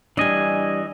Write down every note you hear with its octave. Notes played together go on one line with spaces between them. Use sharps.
E3 G3 D4 D#5 G#5